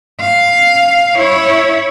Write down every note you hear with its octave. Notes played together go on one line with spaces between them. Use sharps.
F5
E4 C#5